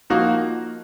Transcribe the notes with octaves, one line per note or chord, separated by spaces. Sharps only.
F3 A#3 D#4 F#4